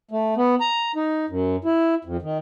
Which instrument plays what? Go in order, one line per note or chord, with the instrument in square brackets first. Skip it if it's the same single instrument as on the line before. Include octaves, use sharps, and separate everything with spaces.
[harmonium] A3
B3
A#5
D#4
F#2
E4
F2
D#3